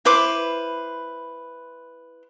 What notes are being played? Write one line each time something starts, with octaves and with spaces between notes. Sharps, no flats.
E4 B4 C5 D6